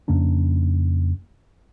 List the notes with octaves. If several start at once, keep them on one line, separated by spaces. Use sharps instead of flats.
F2 C#3 A#3 D4